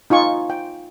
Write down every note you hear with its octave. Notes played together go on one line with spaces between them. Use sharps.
D#4 F4 G#5 C#6
G5